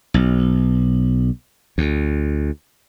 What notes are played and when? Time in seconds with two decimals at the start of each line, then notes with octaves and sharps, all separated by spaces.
0.14 B1
1.78 D2